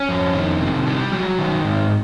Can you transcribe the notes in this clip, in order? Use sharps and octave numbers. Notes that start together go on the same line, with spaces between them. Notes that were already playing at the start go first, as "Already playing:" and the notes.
Already playing: C#4
F2
D#3
C3
G3
F#3
D#3
G#2